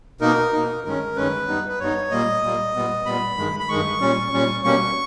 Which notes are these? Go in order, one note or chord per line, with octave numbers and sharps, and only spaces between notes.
B2 A#3 D#4 A#4
B2 A#3 D#4
G2 D#3 G#3 C#4 A#4
G2 D#3 G#3 C#4 B4
G2 G3 B3 D#4
B4
G2 G3 B3 D#4 C#5
A#2 G3 A#3 D#5
A#2 G3 A#3
A#2 G3 B3
A#2 G3 B3 B5
G2 D#3 G#3
B5
G2 D#3 G#3 C#6
A#2 G3 C#4
A#2 G3 C#4
B2 G3 A#3 C#4 C#6